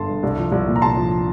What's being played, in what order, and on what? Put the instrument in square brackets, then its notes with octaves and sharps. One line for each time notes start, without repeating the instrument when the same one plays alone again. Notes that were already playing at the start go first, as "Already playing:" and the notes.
Already playing: [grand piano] G1 A5 C6
G2
C2
F3
C2
A#2
A#5
C2 A5 C6
F3